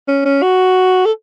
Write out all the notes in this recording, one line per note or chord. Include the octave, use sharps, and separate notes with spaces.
C#4
C#4
F#4
A4